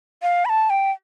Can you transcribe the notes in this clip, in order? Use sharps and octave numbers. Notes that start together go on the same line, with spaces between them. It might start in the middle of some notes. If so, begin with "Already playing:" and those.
F5
B5
A5
G5